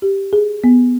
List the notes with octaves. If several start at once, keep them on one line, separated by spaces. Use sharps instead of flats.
G4
G#4
B3